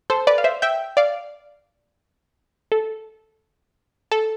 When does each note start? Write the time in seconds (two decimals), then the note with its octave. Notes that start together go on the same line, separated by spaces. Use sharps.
0.10 A4 C5
0.27 B4 D5
0.38 F5
0.44 C5 E5
0.62 E5 G5
0.97 D5 F5
2.72 A4
4.11 A4